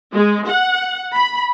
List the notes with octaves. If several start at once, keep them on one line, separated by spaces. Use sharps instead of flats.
G#3
F#5
B5